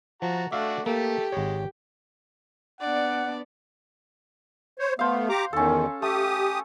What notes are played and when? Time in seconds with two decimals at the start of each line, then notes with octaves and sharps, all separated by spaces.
0.22 F3 F#4 A5 A#5
0.52 A3 D4 F#4 E5 F5 D6
0.86 A3 A#3 G4 A4
1.32 G#1 G#3 C#5
2.81 B3 D4 D5 F#5
4.79 C5 C#5
4.99 A3 B3 C5 F5
5.29 G4 A#5 D6
5.53 E2 D#3 C#4 A4
6.02 A3 G4 D#6